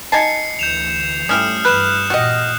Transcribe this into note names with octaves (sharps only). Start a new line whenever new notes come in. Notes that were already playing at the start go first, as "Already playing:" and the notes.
D#4 G#5 A5 C7 C#7
D2 E3 G6 E7 F7
G#2 G3 A3 C#4 E4 G4 D#6 F6
G2 E3 B4 F#6 E7
A#2 F#4 G4 D#5